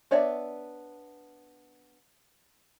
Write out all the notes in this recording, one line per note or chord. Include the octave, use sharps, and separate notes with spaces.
B3 D4 C#5 D5 E5